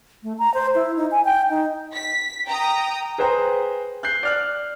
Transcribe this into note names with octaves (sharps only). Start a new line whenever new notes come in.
A3
A#5
C5
E4
D#4
G#5
G5
D#4
B6
G5 A#5 D#6
G#4 B4 C5 G5 A#5
F#6 G6 C7
D5 F6 F#6